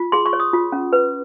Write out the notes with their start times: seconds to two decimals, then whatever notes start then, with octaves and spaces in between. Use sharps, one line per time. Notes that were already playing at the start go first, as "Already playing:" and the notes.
Already playing: F4
0.12 G#4 C6
0.26 C#6
0.33 C#5
0.40 D#6
0.53 F4
0.72 C#4
0.93 B4